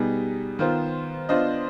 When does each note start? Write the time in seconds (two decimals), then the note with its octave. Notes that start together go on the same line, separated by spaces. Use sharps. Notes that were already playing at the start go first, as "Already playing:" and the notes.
Already playing: B2 G3 B3 D#4 G#4
0.59 D#3 B3 F4 C5
1.29 B3 D4 F4 C5 D#5